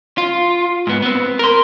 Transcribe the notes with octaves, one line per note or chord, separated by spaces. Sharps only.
F4
G#2 B3
B3 C4
A#4 C6